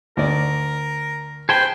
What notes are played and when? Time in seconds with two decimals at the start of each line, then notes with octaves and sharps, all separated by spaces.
0.17 D2 A#4 D5
1.49 G#4 B4 C5 G5 A5